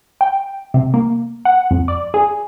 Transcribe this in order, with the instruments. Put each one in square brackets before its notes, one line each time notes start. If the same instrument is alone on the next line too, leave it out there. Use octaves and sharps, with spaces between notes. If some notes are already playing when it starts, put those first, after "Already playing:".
[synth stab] G5
C3
A#3
F#5
F2
D5
G#4